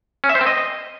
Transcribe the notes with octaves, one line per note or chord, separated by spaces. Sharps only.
C#4
E5
C5
C4
D#5